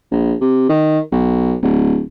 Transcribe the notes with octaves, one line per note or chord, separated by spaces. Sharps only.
A#1
C3
D#3
B1
D1